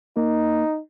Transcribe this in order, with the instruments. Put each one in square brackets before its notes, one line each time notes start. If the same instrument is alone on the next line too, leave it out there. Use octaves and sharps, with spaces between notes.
[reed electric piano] A#3 [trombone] D#4